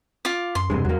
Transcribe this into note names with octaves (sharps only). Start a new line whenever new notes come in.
F4 D6
F#2 C6
E1 C2 G2 C3 G#3
E2 F#3 A#3